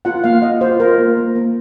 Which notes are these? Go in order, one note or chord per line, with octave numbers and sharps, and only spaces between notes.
F4 F#5
A#3 F5
F4 D#5
F4 C5
F4 A#4
A#3
A#3
A#3